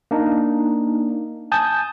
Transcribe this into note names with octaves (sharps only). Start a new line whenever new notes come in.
A#3 D4 D#4
G#5 A5 D#6 G6